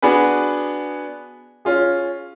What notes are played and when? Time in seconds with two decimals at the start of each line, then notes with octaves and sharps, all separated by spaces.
0.02 B3 D4 F#4 G#4 B4
1.65 C#4 F4 G#4